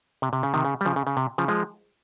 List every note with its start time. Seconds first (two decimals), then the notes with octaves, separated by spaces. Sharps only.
0.22 C3
0.33 C3
0.43 C#3
0.54 C3 D#3
0.65 C#3
0.81 G3
0.85 C#3 F3
0.96 C#3
1.07 C#3
1.17 C3
1.38 C#3 F3
1.48 F3 G#3